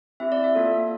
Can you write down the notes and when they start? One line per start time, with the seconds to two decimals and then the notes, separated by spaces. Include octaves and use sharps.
0.20 C4 E4 G4 E5
0.32 D5
0.44 E5
0.55 A#3 F4 A4